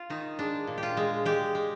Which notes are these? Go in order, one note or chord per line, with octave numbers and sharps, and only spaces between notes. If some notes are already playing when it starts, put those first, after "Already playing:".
Already playing: F4
D#3 D#4
G#3 D4
A#2
G4
F4
G#3
G#3 G4
G#3